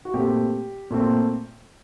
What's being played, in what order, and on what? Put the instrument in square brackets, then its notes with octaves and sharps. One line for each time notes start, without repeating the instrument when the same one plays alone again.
[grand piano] F#4
A#2 A3 C4 G4
A#2 A3 C4